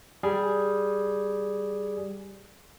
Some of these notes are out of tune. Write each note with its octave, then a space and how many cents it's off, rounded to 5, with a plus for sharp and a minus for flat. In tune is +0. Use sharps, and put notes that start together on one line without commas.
G3 +0 G#4 +0